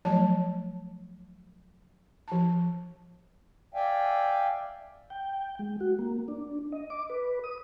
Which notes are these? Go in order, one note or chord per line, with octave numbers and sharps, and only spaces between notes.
F3 F#3 A3 C#5 A5
F3 A5
D5 E5 F5 G5 G#5
G5
G#3
F#4
A#3
D4
D#5
D6
B4
D#6